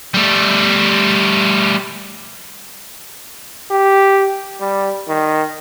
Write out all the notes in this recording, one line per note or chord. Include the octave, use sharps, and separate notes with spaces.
G3 A3
G4
G3
D#3